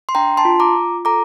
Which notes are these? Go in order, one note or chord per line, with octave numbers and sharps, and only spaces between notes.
C6
D4 G5 A#5
A5 C6
F4
A#5 D6
F4
A4 A#5 D6